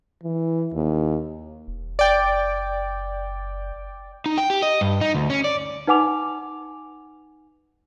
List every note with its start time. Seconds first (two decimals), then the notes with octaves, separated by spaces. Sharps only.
0.24 E3
0.73 D#2
1.68 E1
1.99 F#1 D5 G5
4.26 D#4
4.38 G5
4.50 G4
4.63 D#5
4.81 G2
5.01 D#4
5.15 D2
5.30 C#4
5.44 D5
5.87 D#4 B4 F#5 G#5 D6 F7